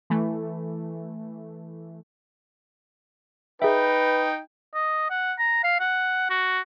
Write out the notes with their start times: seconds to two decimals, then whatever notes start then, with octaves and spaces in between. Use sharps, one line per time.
0.10 E3 A3
3.62 D#4 G#4 B4 E5 G5
4.74 D#5
5.11 F#5
5.39 A#5
5.64 F5
5.80 F#5
6.30 F#4